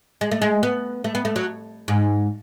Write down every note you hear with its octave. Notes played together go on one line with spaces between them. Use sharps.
G#3
A3
G#3
B3
A3
B3
A3
F#3
G#2